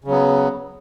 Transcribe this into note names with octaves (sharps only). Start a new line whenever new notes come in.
C#3 F#3 B3